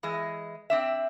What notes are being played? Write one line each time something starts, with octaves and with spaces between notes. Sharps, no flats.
E3 G#3 D#5
C4 D4 E5